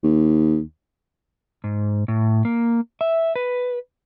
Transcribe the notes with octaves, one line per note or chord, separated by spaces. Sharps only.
D#2
G#2
A2
A#3
E5
B4